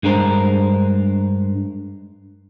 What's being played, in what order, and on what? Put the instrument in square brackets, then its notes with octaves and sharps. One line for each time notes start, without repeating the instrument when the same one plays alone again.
[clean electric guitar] G2 G#3 D4 A#4 C5